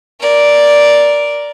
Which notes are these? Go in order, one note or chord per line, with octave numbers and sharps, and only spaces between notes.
A#4 D5